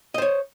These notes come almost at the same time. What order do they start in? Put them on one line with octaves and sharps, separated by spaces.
D#5 C5 C#5